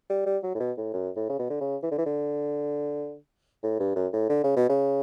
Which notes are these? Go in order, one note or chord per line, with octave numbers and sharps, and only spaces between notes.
G3
G3
F#3
A2
B2
A2
F#2
A2
C#3
B2
D3
C#3
E3
D3
E3
D3
A2
G2
F#2
A2
D3
C#3
B2
C#3